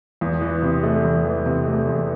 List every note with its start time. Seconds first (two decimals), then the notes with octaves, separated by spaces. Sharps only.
0.21 E2
0.41 E3
0.62 C3
0.83 A3
1.04 E2
1.25 E3
1.46 C3
1.67 A3
1.87 E2